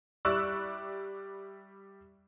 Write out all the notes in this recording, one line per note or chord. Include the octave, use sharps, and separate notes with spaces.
G3 E4 D5 C#6 E6 F#6